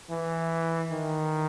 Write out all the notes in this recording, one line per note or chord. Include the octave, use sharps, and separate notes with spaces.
E3
D#3